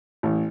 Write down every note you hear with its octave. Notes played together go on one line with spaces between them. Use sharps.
A1